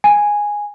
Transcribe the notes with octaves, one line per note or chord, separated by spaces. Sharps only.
G#5